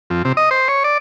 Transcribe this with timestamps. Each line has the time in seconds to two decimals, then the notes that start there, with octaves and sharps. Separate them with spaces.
0.10 F2
0.25 C3
0.37 D#5
0.51 C5
0.68 C#5
0.84 D5